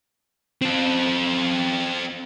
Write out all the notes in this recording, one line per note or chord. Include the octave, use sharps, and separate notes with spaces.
C4 A4